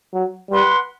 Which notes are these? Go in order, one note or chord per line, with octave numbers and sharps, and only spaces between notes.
F#3
G3 B4 F#5 C6